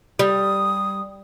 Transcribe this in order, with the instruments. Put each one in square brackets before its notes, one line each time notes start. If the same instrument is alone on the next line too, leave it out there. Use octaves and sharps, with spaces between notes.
[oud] G3 [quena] D#6